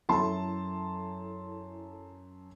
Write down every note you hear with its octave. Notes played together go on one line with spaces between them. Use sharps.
F#2 E4 A4 A5 C6